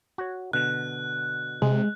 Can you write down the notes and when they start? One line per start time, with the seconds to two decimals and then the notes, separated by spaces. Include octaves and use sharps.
0.18 F#4 C#5
0.53 B2 D3 F#6
1.62 C3 G#3